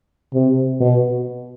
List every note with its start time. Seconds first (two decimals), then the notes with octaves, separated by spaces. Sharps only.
0.34 C3
0.80 B2